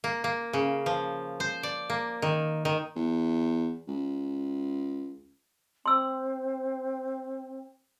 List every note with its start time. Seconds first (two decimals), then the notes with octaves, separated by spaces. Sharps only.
0.04 A#3
0.24 A#3
0.53 C#3
0.86 F3
1.40 C5
1.63 D5
1.90 A#3
2.22 D#3
2.65 D#3
2.96 E2
3.88 C#2
5.86 C4 C6 E6